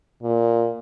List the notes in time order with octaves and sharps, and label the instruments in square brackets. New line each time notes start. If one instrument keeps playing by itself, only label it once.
[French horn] A#2